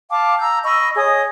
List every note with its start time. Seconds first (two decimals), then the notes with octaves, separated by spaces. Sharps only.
0.10 F5 G5 A5 D6
0.39 A#5 E6 G6
0.64 D#5 B5 C#6 E6
0.95 G#4 C#5 D#5 D#6